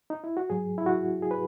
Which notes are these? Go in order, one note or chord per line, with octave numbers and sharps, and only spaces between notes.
D#4
E4
F#4
G#2 F#3 G#4
E4
F#4
G#4
B4